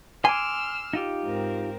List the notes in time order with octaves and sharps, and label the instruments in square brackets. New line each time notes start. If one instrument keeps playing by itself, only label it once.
[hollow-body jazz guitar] G#5 [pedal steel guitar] C6 D6 [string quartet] E6 F6
[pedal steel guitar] D#4 F4 G4
[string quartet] G#2 C4 A#4